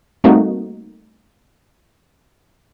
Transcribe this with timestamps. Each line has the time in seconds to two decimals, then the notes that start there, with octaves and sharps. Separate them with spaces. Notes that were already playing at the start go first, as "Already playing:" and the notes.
0.24 G3 A3 A#3 C4 D#4 F#4